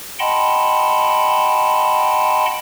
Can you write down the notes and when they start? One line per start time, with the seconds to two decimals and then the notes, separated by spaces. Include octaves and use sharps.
0.19 D#5 F#5 G5 A5 B5 C6